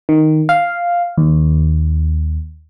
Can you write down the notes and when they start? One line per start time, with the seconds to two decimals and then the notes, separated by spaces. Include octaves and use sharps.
0.09 D#3
0.49 F5
1.18 D#2